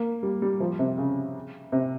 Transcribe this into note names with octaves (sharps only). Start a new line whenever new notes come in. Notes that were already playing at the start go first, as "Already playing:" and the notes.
Already playing: A#3
G3
G3
F3
C3
C#3
C3